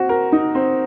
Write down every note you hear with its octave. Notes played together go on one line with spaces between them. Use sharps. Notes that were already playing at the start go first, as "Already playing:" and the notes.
Already playing: C4 F#4
A#4
D#4
C4